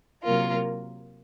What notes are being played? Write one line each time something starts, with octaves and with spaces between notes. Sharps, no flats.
C3 F#3 A#3 F4 A#4